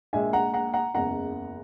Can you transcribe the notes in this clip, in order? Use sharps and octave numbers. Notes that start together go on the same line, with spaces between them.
A#1 A#2 G#3 E5 G#5
F#5 A#5
F#5 A#5
F#5 A#5
F#1 E2 C#3 G#3 F#5 A#5